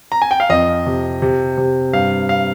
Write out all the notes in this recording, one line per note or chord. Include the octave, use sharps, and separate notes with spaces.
A#5
G#5
G5
F5
F2 D#5
C3
C3
C3
G2 F5
F5